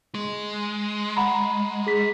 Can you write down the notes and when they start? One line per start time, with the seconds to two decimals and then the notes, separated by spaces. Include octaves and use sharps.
0.15 G#3
1.17 F#5 A#5 B5
1.87 G#4 B6